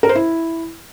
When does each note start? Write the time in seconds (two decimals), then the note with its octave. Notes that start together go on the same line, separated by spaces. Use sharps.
0.03 A#4
0.09 C5
0.15 E4